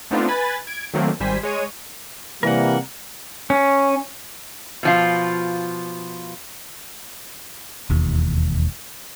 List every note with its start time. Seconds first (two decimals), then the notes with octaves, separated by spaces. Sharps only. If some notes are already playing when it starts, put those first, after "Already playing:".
0.11 A3 B3 C4 D4 D#4 F4
0.28 B4 G#5 B5 A6
0.67 G#6 D7
0.94 D#3 F#3 A3 A#3 C4
1.20 G#1 G3 C5 G#5 B6
1.43 G#3 C#5 D#7
2.43 C3 E3 G3 A#3 A#4 F#5
3.50 C#4
4.83 B2 F3 F4
7.90 E1 D#2